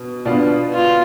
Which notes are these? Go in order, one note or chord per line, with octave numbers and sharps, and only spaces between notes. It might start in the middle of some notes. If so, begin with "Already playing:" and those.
Already playing: B2
B2 B3 D4 F4
F4